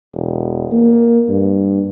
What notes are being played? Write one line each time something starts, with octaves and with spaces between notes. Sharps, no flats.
E1
A#3
G2